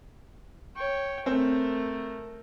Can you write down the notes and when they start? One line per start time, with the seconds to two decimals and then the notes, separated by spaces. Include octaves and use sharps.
0.76 C#5 G5
1.26 A3 C4 A#4